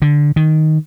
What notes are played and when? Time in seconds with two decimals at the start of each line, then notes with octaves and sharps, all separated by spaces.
0.02 D3
0.36 D#3